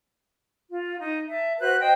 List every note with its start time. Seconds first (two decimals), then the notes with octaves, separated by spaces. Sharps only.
0.69 F4
0.99 D#4
1.29 E5 A5
1.59 F#4 B4 C5 F#6
1.79 C5 D#5 G5